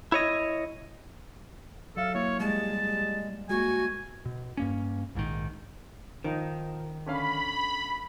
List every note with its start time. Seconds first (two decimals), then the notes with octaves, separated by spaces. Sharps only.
0.12 E4 C#5 D#5
1.97 F#3 A4 E5 F5
2.15 A#3 E4 C#5
2.40 G3 G#3 A5
2.72 G3
3.50 G#3 A#3 F#4 G#5
4.26 B2
4.57 G2 A#3 C#4
5.15 A#1 G#2 D3 D#3
6.24 D#3 F3 D#4
7.06 D3 C#4 F5 B5